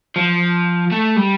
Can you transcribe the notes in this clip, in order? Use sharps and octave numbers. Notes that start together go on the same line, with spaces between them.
F3
A3
G3